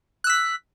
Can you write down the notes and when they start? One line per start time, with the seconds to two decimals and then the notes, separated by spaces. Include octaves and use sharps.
0.24 F#6
0.27 E6
0.30 B6